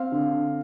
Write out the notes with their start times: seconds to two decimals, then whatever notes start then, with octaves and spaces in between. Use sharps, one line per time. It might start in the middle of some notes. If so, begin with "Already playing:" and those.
Already playing: C4 F5
0.12 D3